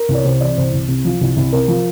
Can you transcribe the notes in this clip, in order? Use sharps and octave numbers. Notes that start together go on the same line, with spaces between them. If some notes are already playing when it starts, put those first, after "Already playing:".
Already playing: A#4
C2
C#5
C3 C5
E3 D5
C2 C5
C2
C3
F3
C2
C2
C3 A#4
F3